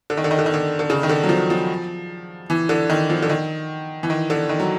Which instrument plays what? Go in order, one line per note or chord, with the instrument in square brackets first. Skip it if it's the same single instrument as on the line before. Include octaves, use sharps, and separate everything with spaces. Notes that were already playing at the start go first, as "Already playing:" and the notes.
[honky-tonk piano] D3
D#3
D3
D#3
D3
D#3
D3
D3
C#3
D#3
D3
F#3
F3
F3
E3
D3
D#3
F3
D3
D#3
E3
D#3
D3
D#3
F#3